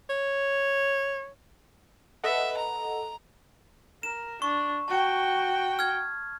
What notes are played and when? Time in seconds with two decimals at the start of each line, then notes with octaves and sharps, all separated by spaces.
0.10 C#5
2.24 A4 B4 D#5 E5 F#5
2.56 A#5
4.03 A#4 E7
4.42 D4 C#6
4.88 F#4 G5 A5
5.79 F6 G#6